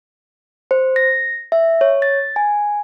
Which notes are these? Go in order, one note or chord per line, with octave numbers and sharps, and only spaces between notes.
C5
A#6
E5
C#5
A6
G#5